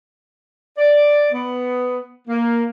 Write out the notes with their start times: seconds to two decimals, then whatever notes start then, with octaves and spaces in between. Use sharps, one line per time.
0.78 D5
1.32 B3
2.28 A#3